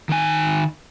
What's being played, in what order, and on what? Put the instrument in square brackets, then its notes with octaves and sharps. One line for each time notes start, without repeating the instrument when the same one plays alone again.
[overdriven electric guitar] D#3 G#5